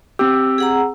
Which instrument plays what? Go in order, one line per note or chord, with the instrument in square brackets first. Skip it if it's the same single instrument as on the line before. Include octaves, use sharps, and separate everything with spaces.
[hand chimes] C4 E6 [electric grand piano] G4
[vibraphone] G#4 F#5 A#5